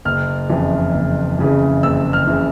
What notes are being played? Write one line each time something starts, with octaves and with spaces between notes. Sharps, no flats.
F#1 F6
F2 C#3 E3
F#1
F2 C#3 E3
F#1 E6
F6
C#3 E3